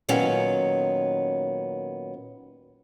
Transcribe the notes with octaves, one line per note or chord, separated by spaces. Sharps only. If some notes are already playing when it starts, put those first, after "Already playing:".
A#2 D#3 F#3 B3 C#4